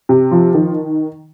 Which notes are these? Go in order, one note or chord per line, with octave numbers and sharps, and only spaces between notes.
C3
F3
D#3